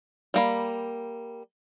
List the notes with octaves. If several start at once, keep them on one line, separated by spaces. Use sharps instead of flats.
G3 A#3 B5